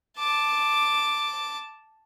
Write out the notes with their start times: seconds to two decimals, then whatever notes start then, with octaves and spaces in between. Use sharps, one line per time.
0.18 A5 D6